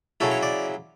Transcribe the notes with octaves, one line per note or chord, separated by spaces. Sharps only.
C#3 F#3 C#4 E4 A4
C#5
D5